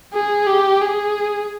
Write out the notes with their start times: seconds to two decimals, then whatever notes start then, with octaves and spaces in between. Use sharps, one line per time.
0.14 G#4
0.47 G4
0.81 G#4